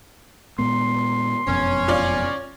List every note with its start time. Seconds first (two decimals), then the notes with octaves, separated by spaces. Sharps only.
0.59 A#2 G#3 B3 C6
1.47 F#1 F2 B2 C#4
1.88 F4 C#5 D5